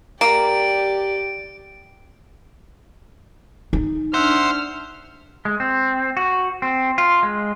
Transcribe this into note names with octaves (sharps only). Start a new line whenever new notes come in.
A#3 G4 D5 D7
D#4
D4 C5 E5 F#5 F6
G#3
C4
F#4
C4
F4
G#3